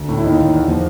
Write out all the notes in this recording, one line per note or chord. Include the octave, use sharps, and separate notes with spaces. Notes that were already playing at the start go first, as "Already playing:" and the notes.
Already playing: D2
A2
E4
D#2 D#4
D#2
E2
F3